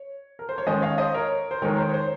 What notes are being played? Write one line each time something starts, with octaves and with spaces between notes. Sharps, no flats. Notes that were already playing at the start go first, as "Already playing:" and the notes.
Already playing: C#5
A#4
C5
C#5
D#3 G#3 C#4 C5 D#5
C#5 F5
C5 D#5
A#4 C#5
C5
D#3 G#3 D#4 A#4 C#5
A#4
C5
C#5
C5